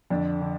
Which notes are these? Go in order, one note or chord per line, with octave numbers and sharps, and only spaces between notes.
F2 D3 D4
D3